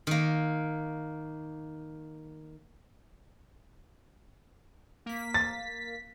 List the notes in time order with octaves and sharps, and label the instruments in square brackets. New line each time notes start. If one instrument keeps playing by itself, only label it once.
[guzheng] D#3 A#3
[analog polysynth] A#3 B6
[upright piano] A6